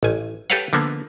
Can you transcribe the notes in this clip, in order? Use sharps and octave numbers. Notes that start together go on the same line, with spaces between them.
A1 G#5
G4 A4 B4 C#5 F5 F#5
D3 F3 A#3 B3